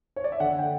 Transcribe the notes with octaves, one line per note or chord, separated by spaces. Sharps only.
C#5
D5
E5
D3 F#5
G5